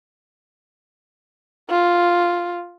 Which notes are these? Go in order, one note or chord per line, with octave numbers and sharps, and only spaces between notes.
F4